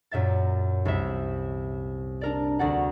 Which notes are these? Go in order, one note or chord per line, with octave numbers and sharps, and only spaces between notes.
F#2 A#2 E5 A6
C2 E5
D4 A#4 D5
D2 F#4 D5 F#5